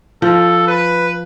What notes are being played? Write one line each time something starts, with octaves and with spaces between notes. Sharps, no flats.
F3 A4
B4